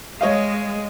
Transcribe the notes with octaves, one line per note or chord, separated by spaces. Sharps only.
G#3 C#5 D#5 F5